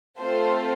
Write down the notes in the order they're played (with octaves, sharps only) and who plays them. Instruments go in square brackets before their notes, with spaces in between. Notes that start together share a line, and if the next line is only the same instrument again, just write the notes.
[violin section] A3 C4 F4 A4 C5